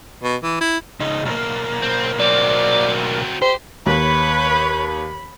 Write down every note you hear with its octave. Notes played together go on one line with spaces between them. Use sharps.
B2
E3
E4
C#2 D#4
B1 A#3
C4
F#3 C4 D5
G4 C5
D#2 B4 C#5 B5